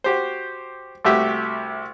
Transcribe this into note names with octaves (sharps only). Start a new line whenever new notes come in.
F#4 G4 C5
C2 A3 F#4 G4 E5